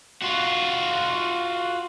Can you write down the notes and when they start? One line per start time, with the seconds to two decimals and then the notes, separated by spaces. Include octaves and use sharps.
0.22 F4 F#4